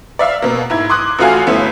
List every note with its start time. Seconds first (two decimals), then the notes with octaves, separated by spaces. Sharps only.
0.19 D5 E5 F5 E6
0.42 B2 A#3
0.70 G#2 E4 G#6
0.89 C6 D6 D#6 F#6
1.19 A1 A3 F4 F#4 F5 G#5
1.47 G1 A3 B3 E4